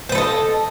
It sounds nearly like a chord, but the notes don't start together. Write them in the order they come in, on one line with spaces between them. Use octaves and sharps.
C5 B4 A4 D#5